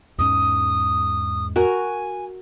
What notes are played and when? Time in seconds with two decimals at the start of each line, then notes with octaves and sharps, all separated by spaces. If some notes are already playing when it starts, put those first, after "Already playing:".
0.18 E2 G#2 C#4 D#6
1.56 F#4 A#4 G#5